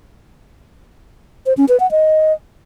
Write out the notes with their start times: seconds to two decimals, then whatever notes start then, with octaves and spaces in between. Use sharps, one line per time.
1.46 C5
1.57 C#4
1.69 B4
1.80 F#5
1.91 D#5